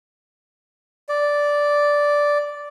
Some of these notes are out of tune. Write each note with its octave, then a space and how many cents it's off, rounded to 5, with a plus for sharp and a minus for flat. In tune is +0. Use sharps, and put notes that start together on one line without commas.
D5 -5